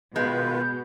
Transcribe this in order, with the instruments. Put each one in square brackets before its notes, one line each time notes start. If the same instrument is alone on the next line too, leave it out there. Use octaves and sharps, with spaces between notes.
[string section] B2 B3 [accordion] D#3 F4 B4 [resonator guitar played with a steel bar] G#3 [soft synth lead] G6